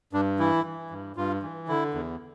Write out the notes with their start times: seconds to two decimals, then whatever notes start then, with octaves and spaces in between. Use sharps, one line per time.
0.13 G2 D4
0.39 E3 E4
0.65 E3
0.91 G2
1.16 G2 F4
1.42 E3
1.68 D3 E4
1.94 E2